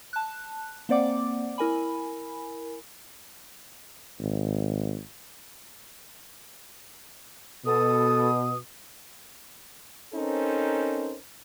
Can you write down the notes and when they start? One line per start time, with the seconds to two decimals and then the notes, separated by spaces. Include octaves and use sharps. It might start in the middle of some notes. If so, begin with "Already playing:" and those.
0.13 A5 F#6
0.89 A#3 C4 C5 D5 F#5 D6
1.58 E4 A#4 G#5 B5
4.19 G#1
7.66 B2 A4 D#6
10.14 C4 C#4 D#4 A4 A#4 C5